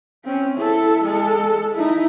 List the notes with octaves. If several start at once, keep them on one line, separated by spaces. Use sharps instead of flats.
C4 C#4
E4 A4
G#3 A4
D#4 E4